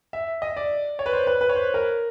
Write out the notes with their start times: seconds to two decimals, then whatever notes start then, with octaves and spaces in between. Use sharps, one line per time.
0.13 E5
0.42 D#5
0.57 D5
0.99 C#5
1.06 B4
1.13 C5
1.27 B4
1.41 B4
1.49 C#5
1.56 C5
1.74 A#4